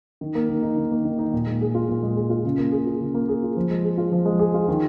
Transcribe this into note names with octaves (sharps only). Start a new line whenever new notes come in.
D#3
A#3
D#3
D#4
D#3
A#3
D#3
D#4
A#2
G#3
G#4
F4
A#2
G#3
G#4
F4
C#3
A#3
G#4
F4
C#3
A#3
G#4
F4
F3
G#3
G#4
F4
F3
G#3
G#4
F4
D#3